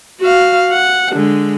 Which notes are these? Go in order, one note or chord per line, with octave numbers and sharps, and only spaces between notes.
F#4 F5
F#5
D3 G#3